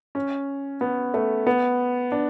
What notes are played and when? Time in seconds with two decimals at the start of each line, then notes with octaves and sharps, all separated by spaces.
0.15 C#4
0.81 B3
1.14 A3
1.47 B3
2.12 D4